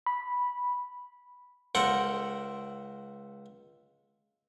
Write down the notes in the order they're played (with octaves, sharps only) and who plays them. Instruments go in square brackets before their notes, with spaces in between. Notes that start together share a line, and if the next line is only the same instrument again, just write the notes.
[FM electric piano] B5
[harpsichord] C#2 A4 A#4 C5 F#5 A5